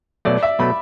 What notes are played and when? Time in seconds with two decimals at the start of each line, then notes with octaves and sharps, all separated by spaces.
0.25 B2 F#3 A3 D5
0.43 E5
0.59 B2 F#3 A3 B5